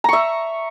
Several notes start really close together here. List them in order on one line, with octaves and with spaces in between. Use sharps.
A#5 C#6 E5